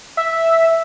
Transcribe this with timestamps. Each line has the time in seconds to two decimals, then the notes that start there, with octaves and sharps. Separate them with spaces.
0.17 E5